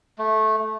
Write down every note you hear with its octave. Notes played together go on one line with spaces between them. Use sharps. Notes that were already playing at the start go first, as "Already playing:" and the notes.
A3